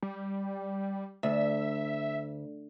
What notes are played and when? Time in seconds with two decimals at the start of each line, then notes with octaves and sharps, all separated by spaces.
0.03 G3
1.23 D2 E5